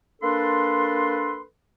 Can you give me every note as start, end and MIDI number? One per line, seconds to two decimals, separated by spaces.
0.22 1.41 58
0.22 1.41 62
0.22 1.41 69
0.22 1.41 71
0.22 1.41 84